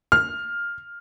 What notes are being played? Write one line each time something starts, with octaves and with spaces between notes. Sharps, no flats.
F6